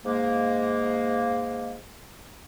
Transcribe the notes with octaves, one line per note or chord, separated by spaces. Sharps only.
G#2 G#3 A#3